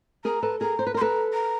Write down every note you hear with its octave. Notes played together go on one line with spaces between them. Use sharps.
G#4 A#4 A#5
A4 B4
G#4 A#4 A#5
C5
B4
A#4
C6
A4 B4 A#5
A#5